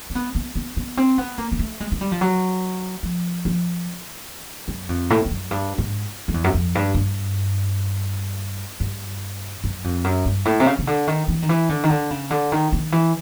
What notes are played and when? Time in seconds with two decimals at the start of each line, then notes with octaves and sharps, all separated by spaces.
0.10 C4
0.15 B3
0.35 B3
0.55 B3
0.76 B3
0.97 C4
1.18 B3
1.38 A#3
1.52 A#3
1.59 A3
1.80 G#3
1.92 G#3
2.01 G3
2.12 F3
2.21 F#3
3.03 F3
3.45 F3
4.68 F#2
4.89 F2
5.10 A2
5.25 F2
5.31 F#2
5.51 G2
5.78 G#2
6.28 F2
6.34 E2
6.44 F#2
6.54 F2
6.75 G2
6.94 G2
8.80 G2
9.64 F#2
9.84 F2
10.04 F#2
10.25 G2
10.45 A2
10.60 C3
10.66 C#3
10.79 C#3
10.87 D3
11.07 D#3
11.28 E3
11.42 D#3
11.49 E3
11.69 D3
11.83 D#3
11.90 D3
12.10 C#3
12.30 D3
12.52 D#3
12.73 D#3
12.92 E3